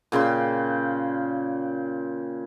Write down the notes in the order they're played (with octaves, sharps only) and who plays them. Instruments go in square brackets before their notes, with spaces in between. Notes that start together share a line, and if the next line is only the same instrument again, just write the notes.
[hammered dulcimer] A#2 C#3 G5 C6